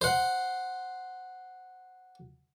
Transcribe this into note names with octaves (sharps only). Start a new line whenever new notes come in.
C5 F#5